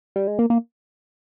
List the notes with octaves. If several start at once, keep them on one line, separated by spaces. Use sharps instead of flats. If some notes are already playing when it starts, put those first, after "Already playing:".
G3
G#3
A#3
A#3